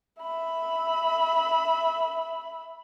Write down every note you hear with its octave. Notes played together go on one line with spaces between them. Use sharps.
E5 B5